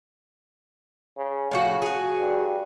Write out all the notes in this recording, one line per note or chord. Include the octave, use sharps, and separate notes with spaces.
C#3
A2 C#3 F3 F#4
F#4 G#4
G2